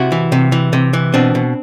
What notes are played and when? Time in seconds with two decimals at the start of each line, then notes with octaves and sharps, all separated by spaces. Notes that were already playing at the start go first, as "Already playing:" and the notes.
Already playing: C3 E4 F#4
0.12 E3
0.32 C3
0.52 E3
0.73 C3
0.93 E3
1.14 B2 C4 D4
1.35 B2